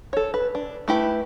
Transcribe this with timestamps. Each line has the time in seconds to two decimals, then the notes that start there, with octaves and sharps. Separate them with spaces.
0.13 A4 C#5
0.34 B4
0.55 D4
0.88 A3 E4 G4 B4